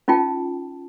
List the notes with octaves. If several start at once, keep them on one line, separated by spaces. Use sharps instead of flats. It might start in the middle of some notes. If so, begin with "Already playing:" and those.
C#4 D#4 F4 G5 A5